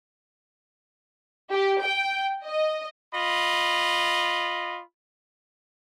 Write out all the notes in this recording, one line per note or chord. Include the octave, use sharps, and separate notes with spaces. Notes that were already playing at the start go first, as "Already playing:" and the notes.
G4
G5
D#5
F4 D#5 B5